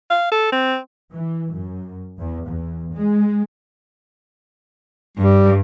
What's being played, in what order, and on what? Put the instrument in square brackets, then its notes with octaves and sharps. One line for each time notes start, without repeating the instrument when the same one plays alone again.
[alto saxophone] F5
A4
C4
[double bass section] E3
F#2
E2
E2
G#3
[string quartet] G2 [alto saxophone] G3